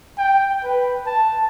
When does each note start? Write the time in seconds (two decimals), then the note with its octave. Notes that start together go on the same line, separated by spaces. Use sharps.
0.18 G5
0.64 B4
1.06 A5